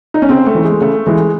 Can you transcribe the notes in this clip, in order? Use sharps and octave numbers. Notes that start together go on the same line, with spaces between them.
D#4
C#4
C#3 C4
A3
E3
G#3
C#3 A3
E3 G#3